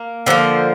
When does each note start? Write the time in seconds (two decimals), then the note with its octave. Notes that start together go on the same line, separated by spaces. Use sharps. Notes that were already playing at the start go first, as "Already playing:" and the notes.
Already playing: A#3
0.26 D3 F3 A#3